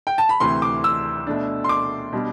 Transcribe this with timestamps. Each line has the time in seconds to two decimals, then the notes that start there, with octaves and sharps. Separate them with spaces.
0.07 G5
0.18 A5
0.29 B5
0.40 D2 C3 E3 C6
0.62 D6
0.84 E6
1.27 B2 A3 D4
1.64 C6
1.69 D6
2.13 B2 G3 D4